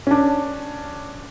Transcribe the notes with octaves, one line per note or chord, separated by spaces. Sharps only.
C#4 D4